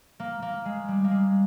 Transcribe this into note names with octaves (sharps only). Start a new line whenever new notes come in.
A#3
A#3
G#3
G3
A#3
G#3